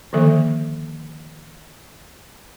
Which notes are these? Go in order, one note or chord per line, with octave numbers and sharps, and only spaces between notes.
D3 D#3 F3 A#3 A4 E5